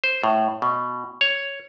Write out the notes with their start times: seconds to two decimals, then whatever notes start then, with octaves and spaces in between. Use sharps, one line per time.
0.04 C5
0.24 A2
0.62 B2
1.21 C#5